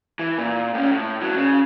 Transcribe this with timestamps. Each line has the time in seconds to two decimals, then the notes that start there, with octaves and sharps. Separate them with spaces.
0.19 E3
0.38 A#2
0.74 A2 C#4
0.91 A2
1.21 A2 F#3
1.36 C#3